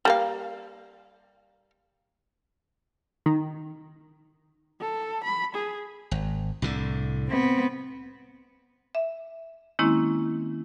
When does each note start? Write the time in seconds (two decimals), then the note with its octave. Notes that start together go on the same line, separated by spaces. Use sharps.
0.05 G3 A#3 F5
3.26 D#3
4.81 A4
5.24 B5
5.55 G#4
6.11 G#1
6.62 C2 A2 D3
7.28 B3 C4
8.95 E5
9.79 D#3 G#3 A#3 C4 C#4 E4